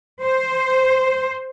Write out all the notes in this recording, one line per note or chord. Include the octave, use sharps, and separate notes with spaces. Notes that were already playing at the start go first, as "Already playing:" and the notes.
C5